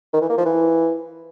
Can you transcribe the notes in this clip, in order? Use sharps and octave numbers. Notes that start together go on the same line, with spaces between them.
D#3
E3
A#3
F3
E3